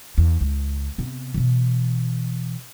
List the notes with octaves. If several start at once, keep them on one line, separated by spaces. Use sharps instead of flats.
E2
C#2
C3 B3
B2 E3